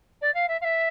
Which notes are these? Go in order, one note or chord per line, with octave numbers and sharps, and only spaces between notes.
D5
F5
E5
F5
E5